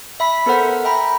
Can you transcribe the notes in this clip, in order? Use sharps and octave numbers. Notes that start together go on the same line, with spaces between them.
E5 B5 B6
B3 A4 A#4 C5 F#5
E5 G5 A#5 B5